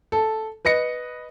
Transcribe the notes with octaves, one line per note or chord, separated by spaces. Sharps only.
A4
B4 D#5 A#6 C#7